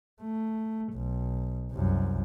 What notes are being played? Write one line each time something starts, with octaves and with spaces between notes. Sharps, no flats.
A3
B1
C2 F#2